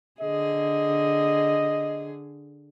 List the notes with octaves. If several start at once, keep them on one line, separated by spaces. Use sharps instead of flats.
D3 G#4 D#5